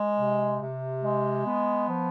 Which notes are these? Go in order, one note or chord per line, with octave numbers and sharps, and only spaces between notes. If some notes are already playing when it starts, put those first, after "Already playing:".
Already playing: G#3
C3
C3
G#3
B3
F3